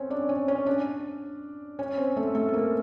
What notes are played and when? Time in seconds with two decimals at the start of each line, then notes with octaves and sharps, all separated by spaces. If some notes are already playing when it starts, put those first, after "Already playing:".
Already playing: C4 C#4 C5 C#5
0.10 D4 D5
0.29 C#4 C#5
0.48 C#4 C#5
0.66 D4 D5
1.79 C#4 C#5
1.98 C4 C5
2.16 A3 A4
2.35 A3 A4
2.49 A4
2.53 A#3 A#4